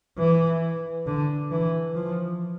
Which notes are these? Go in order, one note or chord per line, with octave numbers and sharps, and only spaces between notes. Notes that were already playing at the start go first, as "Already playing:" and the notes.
E3
D3
E3
F3